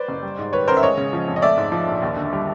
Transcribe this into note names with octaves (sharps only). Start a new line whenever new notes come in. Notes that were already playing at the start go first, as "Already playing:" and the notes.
Already playing: B4 C5 D5
F#1
G3
G#2
D#3 B4 C#5
A1 A#4 C5
E5
G#3 C#5 D#5
C#3
F3
F2
D#5
A3 D5 E5
G#2
F3
A#1
D#2
D3
G3